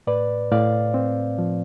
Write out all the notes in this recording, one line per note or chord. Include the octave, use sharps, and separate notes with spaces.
A2 B4 D5
A2 D5 F5
C4
F3